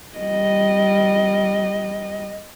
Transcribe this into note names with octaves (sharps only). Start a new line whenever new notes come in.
G3 D#5